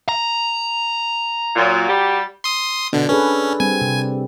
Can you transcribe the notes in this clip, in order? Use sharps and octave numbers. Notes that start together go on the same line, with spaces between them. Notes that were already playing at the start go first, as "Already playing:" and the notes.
A#5
A#2 F#3
G3 F#4 G4
C6 D#6
B2 D3 D4
C#4 G#4 A4 B4
G3 C4 G#5
C3